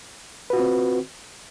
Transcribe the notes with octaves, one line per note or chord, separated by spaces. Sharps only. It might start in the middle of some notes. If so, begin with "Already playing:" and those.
C4 F4 F#4 B4